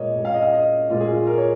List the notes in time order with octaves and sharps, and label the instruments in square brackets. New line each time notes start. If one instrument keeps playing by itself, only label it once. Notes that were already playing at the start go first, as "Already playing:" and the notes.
Already playing: [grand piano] A#2 G#3 A#4 C#5 D#5
A#2 G#3
F5
D#5
F5
D#5
A#2 G#3 F4
G#4
F4
A#4
C#5